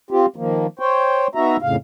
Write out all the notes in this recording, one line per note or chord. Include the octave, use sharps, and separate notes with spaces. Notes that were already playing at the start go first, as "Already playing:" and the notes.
C4 F4 G4
D#3 F3 A#3
C5 C#5 G5
B3 D#4 F#4 E5 A#5
F2 A2 C#3 F5